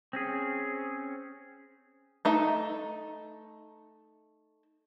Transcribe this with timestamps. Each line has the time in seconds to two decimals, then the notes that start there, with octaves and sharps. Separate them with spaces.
0.13 C4 C#4 G#4
2.25 A3 D#4 E5